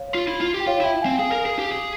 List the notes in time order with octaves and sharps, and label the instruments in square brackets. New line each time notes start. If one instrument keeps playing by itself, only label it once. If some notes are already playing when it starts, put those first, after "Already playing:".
Already playing: [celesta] C#5 F5
[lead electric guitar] F4
E4
F4
G4
[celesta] G5
[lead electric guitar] F4 [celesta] C#5 F5
[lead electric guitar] E4 [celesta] E5 G5
[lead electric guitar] C4 [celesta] F5 G#5
[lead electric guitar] G#4 [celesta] F5 G#5
[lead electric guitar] A#4
G#4
G4
G#4